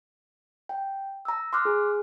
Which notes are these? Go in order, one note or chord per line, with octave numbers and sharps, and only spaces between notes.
G5
A#5 E6
C6 D6 F6 F#6
G#4